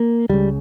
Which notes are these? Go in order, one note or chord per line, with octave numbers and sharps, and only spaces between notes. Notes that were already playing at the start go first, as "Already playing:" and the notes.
Already playing: A#3
C#2 C#3 G3